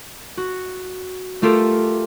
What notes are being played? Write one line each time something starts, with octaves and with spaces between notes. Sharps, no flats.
F#4
A3 F4 G4 A4 A#4